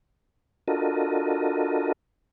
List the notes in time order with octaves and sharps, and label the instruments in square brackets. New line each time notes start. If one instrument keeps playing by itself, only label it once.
[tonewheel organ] D4 F4 F#4 A4 A#4 D#5